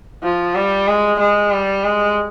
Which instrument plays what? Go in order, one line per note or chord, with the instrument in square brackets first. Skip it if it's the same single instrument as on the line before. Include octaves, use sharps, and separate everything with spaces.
[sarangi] F3
G3
G#3
G#3
G3
G#3